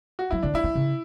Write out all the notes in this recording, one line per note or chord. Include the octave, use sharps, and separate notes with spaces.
F#4
F#3 E4
D3 D4
F#3 E4
E3
C#3